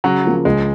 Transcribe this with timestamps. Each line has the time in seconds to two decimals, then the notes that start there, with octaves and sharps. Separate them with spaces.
0.04 C#3 F#3
0.25 F3 A#3
0.45 C#2 G#3